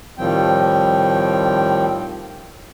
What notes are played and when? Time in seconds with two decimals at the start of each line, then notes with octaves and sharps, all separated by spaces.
0.18 A2 D#3 F3 G3 C4 G5